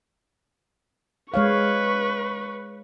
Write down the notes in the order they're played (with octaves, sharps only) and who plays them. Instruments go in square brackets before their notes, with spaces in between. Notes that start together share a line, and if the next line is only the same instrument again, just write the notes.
[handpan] G#3 C#5 F5 [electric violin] B4 C#6